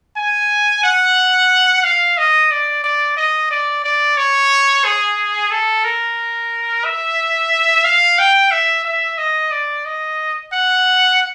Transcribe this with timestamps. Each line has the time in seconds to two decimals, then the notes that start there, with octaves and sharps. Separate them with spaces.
0.17 G#5
0.83 F#5
1.84 F5
2.18 D#5
2.51 D5
2.84 D5
3.17 D#5
3.50 D5
3.84 D5
4.17 C#5
4.85 G#4
5.51 A4
5.84 A#4
6.85 E5
7.84 F5
8.18 G5
8.51 E5
8.85 E5
9.18 D#5
9.51 D5
9.85 D#5
10.53 F#5